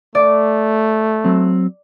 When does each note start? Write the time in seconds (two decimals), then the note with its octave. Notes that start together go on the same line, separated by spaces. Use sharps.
0.15 A3 D5
1.24 F#3 C4